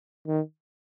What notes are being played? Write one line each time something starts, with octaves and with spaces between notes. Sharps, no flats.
D#3